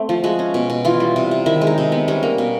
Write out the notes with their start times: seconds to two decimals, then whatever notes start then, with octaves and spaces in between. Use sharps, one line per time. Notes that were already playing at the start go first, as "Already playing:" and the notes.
Already playing: A3 C4
0.09 F3
0.24 G#3 F#4
0.39 C#4
0.54 B2
0.70 B2
0.85 E3 F4
1.00 G3
1.16 C3
1.31 C3
1.46 D#3 E4
1.61 G#3
1.67 D#4
1.78 C3
1.92 B3
2.08 G3 C#4
2.23 A#3
2.38 B2